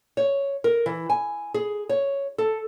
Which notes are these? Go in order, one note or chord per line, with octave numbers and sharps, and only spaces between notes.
C#5
A#4
E3
G#5
G#4
C#5
A4